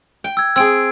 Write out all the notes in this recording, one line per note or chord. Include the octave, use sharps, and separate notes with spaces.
G5
E6 G#6
C4 G#4 E6 D7